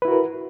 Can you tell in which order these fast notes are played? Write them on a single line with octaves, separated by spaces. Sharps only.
B4 E4 F#4 A#4